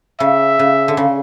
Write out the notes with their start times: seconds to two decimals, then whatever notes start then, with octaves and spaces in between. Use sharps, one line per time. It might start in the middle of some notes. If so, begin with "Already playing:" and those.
0.20 C#3 E5
0.59 C#3
0.88 D3
0.97 C#3